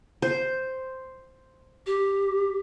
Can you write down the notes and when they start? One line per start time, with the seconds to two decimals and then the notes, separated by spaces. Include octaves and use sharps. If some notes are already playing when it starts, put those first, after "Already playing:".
0.22 C5
1.86 G4